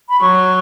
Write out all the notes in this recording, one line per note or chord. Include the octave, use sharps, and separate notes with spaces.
B5
F#3 C#6